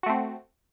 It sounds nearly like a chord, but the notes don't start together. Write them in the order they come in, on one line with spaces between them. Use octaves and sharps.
F#4 A3 C4